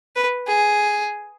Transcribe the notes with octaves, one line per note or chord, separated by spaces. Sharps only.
B4
G#4